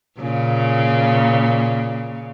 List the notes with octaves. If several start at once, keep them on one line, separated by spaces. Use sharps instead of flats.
A#2 C#3